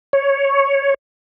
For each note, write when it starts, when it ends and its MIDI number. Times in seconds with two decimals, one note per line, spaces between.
0.13 0.94 73